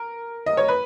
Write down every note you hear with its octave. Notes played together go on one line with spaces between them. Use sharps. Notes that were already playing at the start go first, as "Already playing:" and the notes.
Already playing: A#4
D#5
C#5
B4